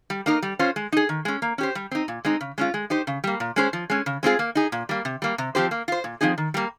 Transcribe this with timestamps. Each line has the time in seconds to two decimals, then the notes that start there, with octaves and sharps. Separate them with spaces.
0.10 G3
0.26 A#3 D#4 A#4
0.43 G3
0.59 C#4 F4 C5
0.76 G#3
0.92 D#4 G#4
1.09 D#3
1.25 G#3 C#4
1.42 A#3
1.58 C#4 G4 C5
1.75 G3
1.91 C4 D#4
2.08 A#2
2.25 G#3 C4 D#4
2.41 C#3
2.58 G#3 C#4 F4
2.74 G#3
2.90 D#4 G4 C5
3.07 C#3
3.24 G3 A#3
3.40 A#2
3.56 G#3 C#4 G#4 C5
3.73 F3
3.90 G#3 C#4
4.06 C#3
4.23 G#3 C4 F4 G#4
4.39 A#3
4.55 D#4 G#4
4.72 A#2
4.89 G3 A#3
5.05 C3
5.22 G3 A#3
5.38 C3
5.55 F3 C4 G4 C5
5.71 A#3
5.88 F4 C5
6.04 A#2
6.21 F3 C4 D#4 G#4
6.38 D#3
6.54 G3 A#3